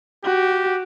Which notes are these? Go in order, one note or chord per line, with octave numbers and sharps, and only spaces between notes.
F#4 G4